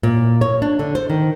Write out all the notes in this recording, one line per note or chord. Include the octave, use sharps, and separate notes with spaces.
A#2
C#5
D4
D3
C5
D#3